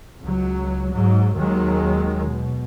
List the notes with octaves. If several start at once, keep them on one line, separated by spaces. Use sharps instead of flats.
C#2 F#3
G#2 F#3
D#2 D#3 F#3 G#3
B2